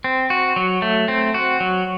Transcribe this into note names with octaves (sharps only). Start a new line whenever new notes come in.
C4
F#4
F#3
A3
C4
F#4
F#3